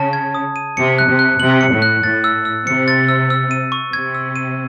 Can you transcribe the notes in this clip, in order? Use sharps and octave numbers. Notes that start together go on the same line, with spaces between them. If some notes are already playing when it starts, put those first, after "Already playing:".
Already playing: C#3 A5
G#6
D#6
D#7
C3 C#7
F#6
C3
F#6
C3 F#7
C#7
A2
F#6
A2 A6
E6
E6
C3 C#7
A6
E6
E6
D#7
C#6
C3 G#6
E6
D#7